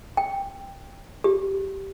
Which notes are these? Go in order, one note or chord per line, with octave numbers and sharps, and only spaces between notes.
G5
G4